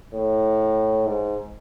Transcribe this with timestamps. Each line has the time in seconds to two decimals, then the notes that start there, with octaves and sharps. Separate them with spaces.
0.14 A2
1.07 G#2